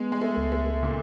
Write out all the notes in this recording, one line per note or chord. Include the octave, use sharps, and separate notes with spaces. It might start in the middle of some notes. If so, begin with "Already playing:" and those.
Already playing: G#3 B3
G#3
A3
C#2
A3
A#2 C#3 A#3